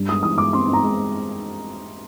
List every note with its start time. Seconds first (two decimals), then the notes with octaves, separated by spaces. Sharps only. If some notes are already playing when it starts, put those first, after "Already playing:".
Already playing: G2
0.09 G#3 D#6
0.23 E3 D#6
0.38 G#3 D6
0.53 C4 C6
0.67 C4
0.73 A#5
0.83 G#3